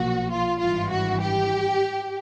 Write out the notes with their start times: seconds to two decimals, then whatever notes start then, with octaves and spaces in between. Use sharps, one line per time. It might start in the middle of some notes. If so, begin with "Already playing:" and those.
Already playing: B1 A#2 F3 F#4
0.31 F4
0.60 G#1 G2 E3 F4
0.91 F#4
1.21 G4